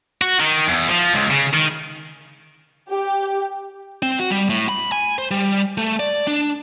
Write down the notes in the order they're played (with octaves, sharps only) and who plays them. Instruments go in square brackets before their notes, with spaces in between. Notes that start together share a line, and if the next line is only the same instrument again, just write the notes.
[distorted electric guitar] F#4
D#3
E2
F3
C#2
C#3
D#3
[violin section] G4
[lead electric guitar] C4
F#4
G3
A2
B5
G#5
C5
G3
A3
D5
D4